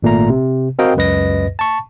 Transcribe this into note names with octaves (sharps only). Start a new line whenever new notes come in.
G#1 A#2 A3 A#5
C3
C4 F#4 A#4 D#5 F5 G5
C#2 F#2 B4 D#5 A#6
A5 C#6